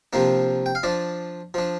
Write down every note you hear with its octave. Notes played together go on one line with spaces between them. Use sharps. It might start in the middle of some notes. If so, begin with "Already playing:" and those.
C3 F3 A#3 D4
G5
F5
F3 D4 D5
F3 D4